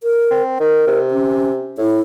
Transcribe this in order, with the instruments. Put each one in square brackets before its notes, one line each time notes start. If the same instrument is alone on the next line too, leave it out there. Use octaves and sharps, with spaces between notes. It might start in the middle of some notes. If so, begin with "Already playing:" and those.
[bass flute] A#4
[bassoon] C4
[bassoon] D#3 [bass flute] A#4
[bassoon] C3
[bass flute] C#4
[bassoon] A2 [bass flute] E4